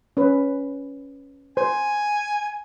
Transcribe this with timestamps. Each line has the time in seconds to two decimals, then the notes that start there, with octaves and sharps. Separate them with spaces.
0.17 C#4 B4
1.57 C5 G#5